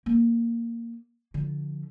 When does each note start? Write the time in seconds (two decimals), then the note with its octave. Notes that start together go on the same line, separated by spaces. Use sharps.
0.06 A#3
1.34 D3 F3